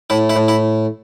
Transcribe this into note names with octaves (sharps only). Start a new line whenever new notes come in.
A2 E4
E4
A2
E4